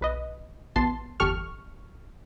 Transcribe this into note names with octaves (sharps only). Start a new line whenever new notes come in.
B1 B4 D#5
A1 B3 A5 C6
G1 E2 G4 A4 C#6 F6